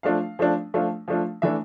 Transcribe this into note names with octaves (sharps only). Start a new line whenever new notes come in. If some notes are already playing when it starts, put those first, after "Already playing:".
F3 A3 D4 F4 F5
F3 A3 D4 F4
F3 A3 D4 F4
F3 A3 D4 F4
E3 A3 D4 E5